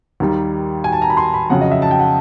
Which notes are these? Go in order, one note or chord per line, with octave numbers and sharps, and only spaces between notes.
D#2 D#3 G3
G#5
A5
A#5
B5
C6
B5
F2 C#3 F#3 F#5
D#5
E5
A5
G5
F#5